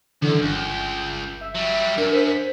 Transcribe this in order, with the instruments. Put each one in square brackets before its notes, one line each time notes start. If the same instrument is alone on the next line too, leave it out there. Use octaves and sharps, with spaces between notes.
[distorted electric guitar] F#2 [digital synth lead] D3 [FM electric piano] E3
[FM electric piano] G1 [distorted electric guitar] C#2 [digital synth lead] G6
[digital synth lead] E5
[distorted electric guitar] F#3 G3
[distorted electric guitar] F#2 [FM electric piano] D4 [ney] A#4
[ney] C5 [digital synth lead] B6